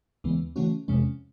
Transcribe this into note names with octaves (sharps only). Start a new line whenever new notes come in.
D#2 C#3 E3 G#3 B3
C#3 E3 A3 C#4 F#4
E2 C3 F3 G#3 C#4